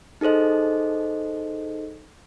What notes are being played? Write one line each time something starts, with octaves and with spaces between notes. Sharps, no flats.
D#4 G#4 A4 C5 D#5